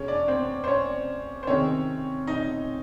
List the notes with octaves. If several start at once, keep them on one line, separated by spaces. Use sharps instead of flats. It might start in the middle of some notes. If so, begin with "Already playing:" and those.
Already playing: E2 B2 G#3 C#4 C#5
D4 D5
C4 C5
C5
C#4 C#5
C5
C3 D#3 G#3 C4 C#4 C#5
D#4 D#5